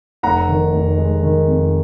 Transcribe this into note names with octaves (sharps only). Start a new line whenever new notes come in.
F1 F#5 A#5
D#3
F1
G#3
D#3
F2